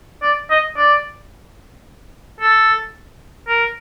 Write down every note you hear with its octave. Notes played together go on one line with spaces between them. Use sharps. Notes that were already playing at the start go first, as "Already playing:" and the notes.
D5
D#5
D5
A4
A#4